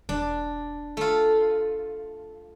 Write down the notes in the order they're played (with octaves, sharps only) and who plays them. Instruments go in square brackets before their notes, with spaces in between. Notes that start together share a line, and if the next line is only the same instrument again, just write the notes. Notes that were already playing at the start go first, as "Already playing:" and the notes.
[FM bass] E1 [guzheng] D4
[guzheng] A3 F4